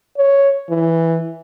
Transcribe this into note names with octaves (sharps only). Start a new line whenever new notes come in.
C#5
E3